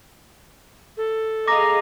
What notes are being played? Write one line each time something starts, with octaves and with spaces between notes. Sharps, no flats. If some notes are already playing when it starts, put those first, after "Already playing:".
A4
G#4 D#5 F5 A#5 D6 A#6